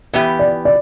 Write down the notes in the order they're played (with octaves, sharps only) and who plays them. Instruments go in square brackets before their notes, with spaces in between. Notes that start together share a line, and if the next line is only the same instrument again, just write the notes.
[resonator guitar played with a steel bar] E3 B3 G4 [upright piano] E5
[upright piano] D5
D5